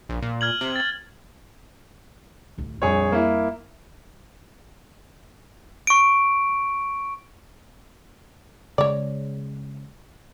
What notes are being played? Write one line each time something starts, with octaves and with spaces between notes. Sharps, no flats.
A#1
A#2
F6 G#6 F#7
C3
A6 F#7
A1 D2
A#1 F2 G3 G#4 C#5
A#3 E4
C#6 D7
C#3 G#3 C#5 D5